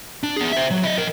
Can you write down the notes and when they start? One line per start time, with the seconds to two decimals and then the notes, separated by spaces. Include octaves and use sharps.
0.23 D4
0.37 B3 G#4
0.52 C5 E5
0.71 F#3
0.83 E4 D#5
0.98 F3 A#4